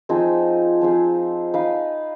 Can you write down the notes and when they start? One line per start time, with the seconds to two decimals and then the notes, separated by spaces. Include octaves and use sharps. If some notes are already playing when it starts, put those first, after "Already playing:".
0.09 F3 C4 D#4 G#4
0.81 F3 C4 D#4 G#4
1.54 D#4 B4 F5